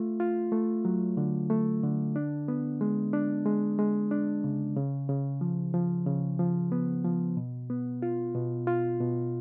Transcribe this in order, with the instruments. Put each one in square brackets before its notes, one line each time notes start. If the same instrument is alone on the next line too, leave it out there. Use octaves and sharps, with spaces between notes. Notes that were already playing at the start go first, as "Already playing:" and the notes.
Already playing: [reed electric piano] A3 F4
F4
A3
F#3
D3
A3
D3
D4
B3
G#3
D4
G#3
G#3
D4
C#3
C#3
C#3
F3
F3
C#3
F3
B3
F3
B2
B3
F4
B2
F4
B2